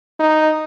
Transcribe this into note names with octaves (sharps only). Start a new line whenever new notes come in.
D#4